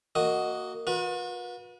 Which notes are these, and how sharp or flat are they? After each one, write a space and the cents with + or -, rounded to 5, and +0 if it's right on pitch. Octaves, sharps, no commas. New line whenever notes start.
A#3 -20 F#4 +0 D#5 +0
F#4 -45 B4 -30